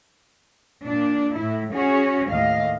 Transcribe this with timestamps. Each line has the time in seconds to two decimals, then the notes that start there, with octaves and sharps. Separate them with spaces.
0.83 A#2 D4
1.35 A2 E4
1.72 C#4 F#4 G#4 C#5
2.31 D#2 A2 D#5 F5